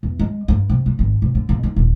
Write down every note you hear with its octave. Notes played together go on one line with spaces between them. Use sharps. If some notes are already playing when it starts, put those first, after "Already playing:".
E2
G#3
G2
C3
G3
G#1
C3
D3
C#3
D#4
D#1